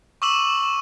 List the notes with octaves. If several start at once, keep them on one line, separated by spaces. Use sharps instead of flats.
C#6 D6 E6 E7 F#7